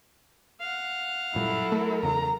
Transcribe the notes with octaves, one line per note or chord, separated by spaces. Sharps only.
F5 F#5
F#1 A#2 F#3 G3 E4 A4
A3 A#4
E2 C#3 A#5